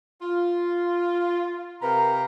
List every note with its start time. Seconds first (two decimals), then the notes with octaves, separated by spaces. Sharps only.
0.22 F4
1.82 C3 A#4 B4 F5 G5 A#5